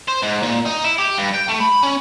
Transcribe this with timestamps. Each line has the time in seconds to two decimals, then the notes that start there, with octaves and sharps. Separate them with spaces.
0.08 C5
0.23 G#2
0.43 A#2
0.66 D#4
0.84 E4
0.98 G4
1.18 G2
1.34 G5
1.48 A3
1.60 B5
1.83 C#4